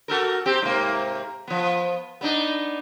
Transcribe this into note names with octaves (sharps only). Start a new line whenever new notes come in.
F#4 A4 A#4
C4 G4
G#2 C3 A#3
F3 B3
B3 D4 D#4